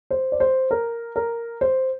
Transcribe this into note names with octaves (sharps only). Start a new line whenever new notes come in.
C5
D5
C5
A#4
A#4
C5